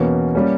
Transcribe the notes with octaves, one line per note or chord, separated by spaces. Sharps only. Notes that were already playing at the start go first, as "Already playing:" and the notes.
Already playing: E2 B2 A#3 C#4
G3 A#3 C#4